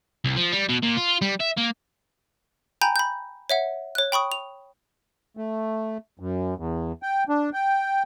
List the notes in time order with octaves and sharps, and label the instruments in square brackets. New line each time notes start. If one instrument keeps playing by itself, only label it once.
[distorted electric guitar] C2
F3
G3
B2
A#2
F4
G3
E5
A#3
[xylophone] G5 G#5 A#5 B5 G6
B5 G6
C#5 E5 F#5
C#5 F#6
G5 B5 C#6 D#6
F7
[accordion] A3
F#2
E2
G5
D4
G5